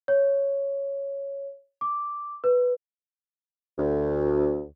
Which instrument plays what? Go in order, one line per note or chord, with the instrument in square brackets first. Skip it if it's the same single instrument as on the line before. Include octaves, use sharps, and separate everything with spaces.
[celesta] C#5
D6
B4
[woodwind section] D2